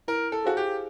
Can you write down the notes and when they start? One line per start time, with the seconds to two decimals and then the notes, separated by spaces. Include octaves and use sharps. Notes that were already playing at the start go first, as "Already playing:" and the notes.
0.08 E4 A#4
0.32 A4
0.44 F#4 G#4 C5 F5 G#5
0.57 G4